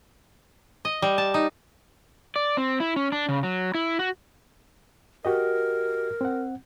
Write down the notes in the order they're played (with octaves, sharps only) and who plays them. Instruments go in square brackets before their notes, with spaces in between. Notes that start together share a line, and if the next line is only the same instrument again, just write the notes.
[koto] D#5
G3
A5
D#4
[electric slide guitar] D5
C4
E4
C#4
D4
C#3
F#3
E4
F#4
[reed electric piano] F#4 G4 D#5 [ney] A#4
[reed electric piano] C4 F#5